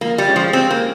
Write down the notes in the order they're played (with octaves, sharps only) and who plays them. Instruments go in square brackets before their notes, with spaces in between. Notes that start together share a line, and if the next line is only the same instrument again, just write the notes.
[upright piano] F3 [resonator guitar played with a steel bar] A#3
[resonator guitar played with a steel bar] G3
[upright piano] G#3 C#4 G4
[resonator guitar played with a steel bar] F3
[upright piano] F3 [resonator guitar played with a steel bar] C4
[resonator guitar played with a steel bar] A#3